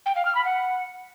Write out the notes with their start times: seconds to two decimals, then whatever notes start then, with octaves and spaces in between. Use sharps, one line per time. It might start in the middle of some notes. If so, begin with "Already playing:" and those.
0.06 G5
0.16 F5
0.25 F6
0.35 B5
0.45 F#5